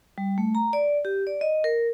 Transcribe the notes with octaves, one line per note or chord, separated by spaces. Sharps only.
G3
A3
A#5
D5
G4
D5
D#5
A#4